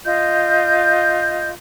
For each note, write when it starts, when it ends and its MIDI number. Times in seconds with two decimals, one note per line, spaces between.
0.05 1.51 65
0.05 1.51 75
0.05 1.51 91